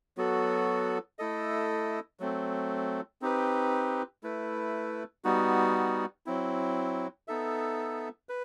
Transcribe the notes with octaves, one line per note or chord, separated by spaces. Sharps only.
F#3 B3 F#4 A4
A3 E4 A4 D#5
F#3 A3 C4
C4 D#4 G4 B4
A3 E4 B4
G3 B3 D#4 F#4
F#3 C4 E4
B3 D#4 A4 E5
B4